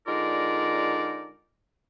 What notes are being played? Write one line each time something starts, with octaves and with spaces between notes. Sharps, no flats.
D3 G#3 D#4 F4 A#4 D5